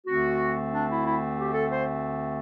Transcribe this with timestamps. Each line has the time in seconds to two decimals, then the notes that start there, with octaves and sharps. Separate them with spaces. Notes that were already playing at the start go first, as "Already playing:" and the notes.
0.07 D2 D3 A3 C4 F#4
0.73 D4
0.89 E4
1.04 E4
1.38 G4
1.53 A4
1.70 C5